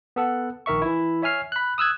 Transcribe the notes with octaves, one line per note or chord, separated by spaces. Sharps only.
B3 A4 F#5
A#1 D#3 A#4 E5 C#6
E3 E4
C#5 E5 G#5 F6 C7
B5 F#6
D#6 E6 F#6 G#6